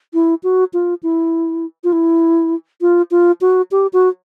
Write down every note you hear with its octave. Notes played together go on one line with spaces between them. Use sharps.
E4
F#4
F4
E4
F4
E4
F4
F4
F#4
G4
F#4